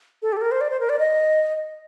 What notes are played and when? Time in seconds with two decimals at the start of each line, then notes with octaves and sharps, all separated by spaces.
0.22 A4
0.33 G4
0.37 A4
0.42 A#4
0.51 C5
0.61 D5
0.70 C5
0.80 A#4
0.89 D5
0.99 D#5